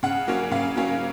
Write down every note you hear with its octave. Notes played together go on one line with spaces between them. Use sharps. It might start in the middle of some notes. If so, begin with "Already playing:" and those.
C#3 F#5
F#3 A#3 C#4
C#3 F5
F#3 A#3 C#4